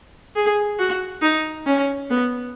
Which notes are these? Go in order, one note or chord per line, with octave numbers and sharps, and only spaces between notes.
G#4
F#4
D#4
C#4
B3